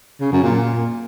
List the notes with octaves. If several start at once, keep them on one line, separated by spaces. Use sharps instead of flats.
C#3
F#2
A#2